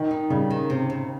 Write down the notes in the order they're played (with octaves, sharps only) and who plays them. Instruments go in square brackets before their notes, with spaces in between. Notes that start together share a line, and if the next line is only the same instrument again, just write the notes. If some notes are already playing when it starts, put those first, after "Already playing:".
Already playing: [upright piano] D#3
[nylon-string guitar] D#4
[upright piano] C#3 [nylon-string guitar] G3
[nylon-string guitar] D#3
C3
C3